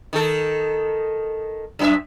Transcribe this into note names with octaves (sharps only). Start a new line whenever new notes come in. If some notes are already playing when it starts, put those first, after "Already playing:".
D#3 A4
F#2 E4 E5